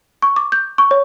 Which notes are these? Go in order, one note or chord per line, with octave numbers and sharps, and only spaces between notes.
C#6
D6
G6
C#6
C#5